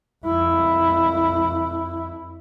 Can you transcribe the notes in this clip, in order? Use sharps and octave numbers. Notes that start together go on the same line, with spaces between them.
F2 E4